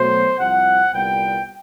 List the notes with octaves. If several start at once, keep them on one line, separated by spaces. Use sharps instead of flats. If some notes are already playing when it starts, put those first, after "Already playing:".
Already playing: B2 F#3 A3 C5
C2 C3 F3 F#5
C2 A#2 G3 B3 G5